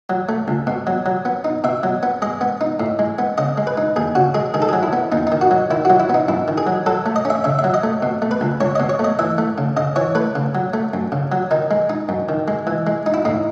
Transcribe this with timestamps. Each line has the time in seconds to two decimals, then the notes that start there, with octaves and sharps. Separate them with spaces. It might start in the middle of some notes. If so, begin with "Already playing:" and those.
0.10 F#3
0.29 A3
0.48 C#2
0.67 B2
0.87 F#3
1.06 F#3
1.25 B3
1.45 D#4
1.64 B2 E5
1.83 F#3
2.03 B3
2.22 G#3 D#5
2.41 B3
2.61 D#4
2.80 A2
2.99 G#3
3.19 B3
3.38 C#3 D#5
3.58 G#3
3.67 B4
3.77 D#4
3.96 D#2 G#4
4.15 C#3 F#4
4.34 G#3 G#4
4.54 D#3 G#4
4.62 A4
4.69 G#4
4.73 F#3
4.83 E4
4.93 B3
5.12 D#2 D#4
5.27 D#4
5.32 D#3
5.41 F#4
5.51 F#3
5.71 D#3 E4
5.85 F#4
5.90 F#3
6.00 E4
6.10 B3 D#4
6.28 F#2 E4
6.48 D#3
6.58 G#4
6.67 F#3
6.86 F#3 A4
7.06 A3
7.16 D#5
7.25 C#4 E5
7.44 C#3 E5
7.59 E5
7.64 F#3
7.74 D#5
7.83 A3
8.03 B2
8.22 A3
8.31 B4
8.41 C#2
8.61 C#2 C#5
8.75 D#5
8.80 B2
8.89 C#5
8.99 A3 D#5
9.19 E3 E5
9.38 A3
9.58 C#3
9.77 C#3 D#5
9.96 E3 C#5
10.15 A3 B4
10.35 C#3
10.55 F#3
10.74 A3
10.94 F#2
11.12 C#3
11.32 F#3
11.51 D#3 D#4
11.71 G#3
11.90 D#4
12.09 F#2
12.29 D#3
12.48 G#3
12.67 E3
12.87 G#3
13.06 D#4
13.14 E4
13.25 A2 D#4